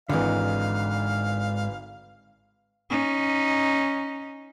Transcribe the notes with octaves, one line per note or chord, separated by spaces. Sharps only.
G#1 G#2 D3 E3 F5
C#4 D#4